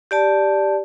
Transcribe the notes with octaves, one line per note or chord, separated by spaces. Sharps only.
G4 D5 A5